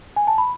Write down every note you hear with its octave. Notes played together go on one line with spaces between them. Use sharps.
G#5
A5
B5